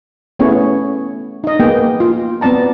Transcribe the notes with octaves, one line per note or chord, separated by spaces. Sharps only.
A3 B3 C#4 E4 G#4 C#5
D#4 D#5
A#3 B3 G#4 G5
F4
B3 C4 D5 A5 A#5